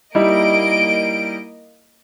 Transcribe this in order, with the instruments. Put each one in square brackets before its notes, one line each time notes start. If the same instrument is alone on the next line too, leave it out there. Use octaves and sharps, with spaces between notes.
[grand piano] G3 D#4 E4 [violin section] A#3 D#5 D7